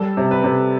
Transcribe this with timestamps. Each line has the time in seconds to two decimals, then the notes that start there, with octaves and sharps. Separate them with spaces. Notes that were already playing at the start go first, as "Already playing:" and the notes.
Already playing: G3 A4
0.17 C3
0.31 B4
0.44 C3